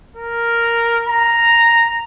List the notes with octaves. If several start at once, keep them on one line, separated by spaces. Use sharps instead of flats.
A#4
A#5